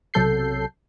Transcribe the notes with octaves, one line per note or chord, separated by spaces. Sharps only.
B1 C3 F#3 A4 G6 C7